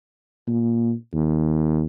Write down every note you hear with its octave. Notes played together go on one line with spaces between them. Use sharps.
A#2
D#2